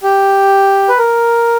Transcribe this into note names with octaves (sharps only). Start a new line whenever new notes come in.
G4
B4
A#4